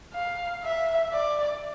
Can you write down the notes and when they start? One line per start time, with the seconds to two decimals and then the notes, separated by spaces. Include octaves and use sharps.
0.13 F5
0.63 E5
1.12 D5